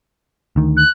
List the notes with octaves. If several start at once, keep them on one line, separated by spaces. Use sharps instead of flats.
D2 D#3
F#6